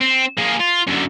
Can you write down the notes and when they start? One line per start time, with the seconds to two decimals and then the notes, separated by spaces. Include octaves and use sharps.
0.01 C4
0.38 A#3 G#4
0.60 F4
0.87 F#2 D3